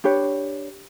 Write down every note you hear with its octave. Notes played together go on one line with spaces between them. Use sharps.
D4 G4 B4 C#5